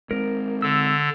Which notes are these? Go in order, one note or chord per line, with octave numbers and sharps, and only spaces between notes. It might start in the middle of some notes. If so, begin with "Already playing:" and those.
G#3 C4 A#4
D3 E6